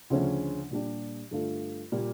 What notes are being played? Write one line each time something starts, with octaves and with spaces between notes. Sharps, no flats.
D2 C#3 F3 C#4
A#2 G3 D4 G4
G2 D3 A3 D4 F4
A#2 G3 A#3